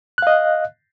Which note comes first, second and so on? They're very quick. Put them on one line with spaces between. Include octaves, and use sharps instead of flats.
F#6 F5 D#5